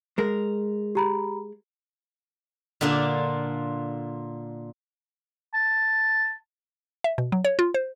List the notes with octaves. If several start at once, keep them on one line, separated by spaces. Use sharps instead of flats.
G#3 A#4
G4 A#5 B5
A#2 D3 A#3 D4 F4
A5
E5
B2
F#3
C#5
F4
C5